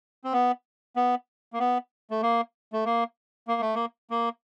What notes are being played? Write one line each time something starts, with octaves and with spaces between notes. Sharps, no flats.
C4
B3
B3
A#3
B3
A3
A#3
A3
A#3
A#3
A3
A#3
A#3